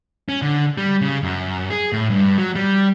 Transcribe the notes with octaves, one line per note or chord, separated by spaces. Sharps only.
C#4
D3
G3
C#3
F#2
G#4
A2
G2
F#3
G3